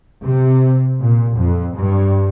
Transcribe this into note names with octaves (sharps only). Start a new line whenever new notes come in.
C3
A#2
F2
G2